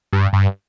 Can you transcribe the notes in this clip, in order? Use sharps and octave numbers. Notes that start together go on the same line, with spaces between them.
G2
G2